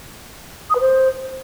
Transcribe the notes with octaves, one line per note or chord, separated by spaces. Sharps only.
D#6
B4
C5